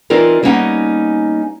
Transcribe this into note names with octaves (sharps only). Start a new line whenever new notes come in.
E3 C4 D#4 F4 A#4 D5
G3 A#3 B3 C#4 D#4 F#5